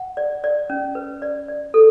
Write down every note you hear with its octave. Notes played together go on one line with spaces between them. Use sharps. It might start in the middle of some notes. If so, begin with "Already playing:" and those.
Already playing: F#5
D5
D5
C#4
B4
D5
D5
A4